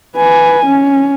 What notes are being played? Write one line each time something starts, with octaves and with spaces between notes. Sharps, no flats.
B4 G#5
C#4